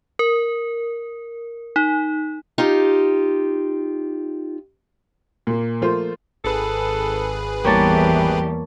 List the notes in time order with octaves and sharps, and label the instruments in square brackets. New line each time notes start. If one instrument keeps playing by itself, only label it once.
[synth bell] A#4
D#4
[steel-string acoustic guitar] D#4 F4 G4
[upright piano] A#2 A#3
F3 A3 A#3 F4 C5
[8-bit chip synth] G#1 G#4 B4 [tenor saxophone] A4
[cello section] E2 E3 G3 [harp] A#3 C#5 A5 [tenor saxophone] G4